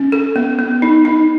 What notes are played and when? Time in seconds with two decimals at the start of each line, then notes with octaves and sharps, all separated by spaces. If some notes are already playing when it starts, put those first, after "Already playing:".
Already playing: C#4
0.12 A4
0.36 B3
0.59 B3
0.82 D#4
1.05 D#4